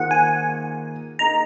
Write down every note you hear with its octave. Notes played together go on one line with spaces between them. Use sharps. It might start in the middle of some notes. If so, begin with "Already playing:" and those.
Already playing: D#3 A#3 F4 G#4 C5 F#5
G#5
A#3 D#4 G#4 D#5 A#5